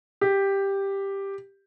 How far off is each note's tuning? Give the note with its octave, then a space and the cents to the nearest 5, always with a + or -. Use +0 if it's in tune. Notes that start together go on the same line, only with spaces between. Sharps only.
G4 +5